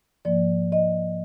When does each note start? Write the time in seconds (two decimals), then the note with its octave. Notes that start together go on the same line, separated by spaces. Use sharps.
0.25 G#2 F3 A#3 D5
0.72 D#5